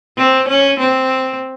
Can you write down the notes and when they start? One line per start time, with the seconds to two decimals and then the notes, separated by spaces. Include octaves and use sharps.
0.18 C4
0.48 C#4
0.80 C4